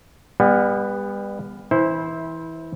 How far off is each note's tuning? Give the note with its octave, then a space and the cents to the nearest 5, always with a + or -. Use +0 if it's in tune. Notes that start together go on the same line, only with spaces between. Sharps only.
G3 +35 B3 -5
E3 -15 E4 -20 C5 +5